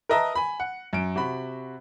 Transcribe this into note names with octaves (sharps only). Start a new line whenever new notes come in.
A#4 B4 D#5 E5 A5 A#5
G#5 B5
F#5
F#2 D7
C3 F#4 B5